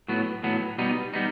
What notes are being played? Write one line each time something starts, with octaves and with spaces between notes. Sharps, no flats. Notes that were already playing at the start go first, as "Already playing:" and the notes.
A2 F#3 B3
A2 F#3 B3
B2 G3 B3 D#4
G3 B3 D#4